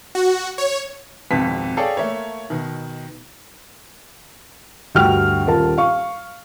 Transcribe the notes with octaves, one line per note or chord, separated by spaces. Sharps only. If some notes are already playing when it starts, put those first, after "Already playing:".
F#4
C#5
G#1 F2 G#2 B2 B3 B6
G#4 A4 C#5 D5 F5 G5
A3 A#3 C#5
B2 D#3
D2 G2 F#4 G5 F6
D#1 F4 A#4 A5
F5 C#6